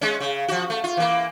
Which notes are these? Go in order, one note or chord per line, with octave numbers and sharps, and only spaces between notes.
G#3 C#4
C#3
F3 F#4
A3
F4
E3 A#3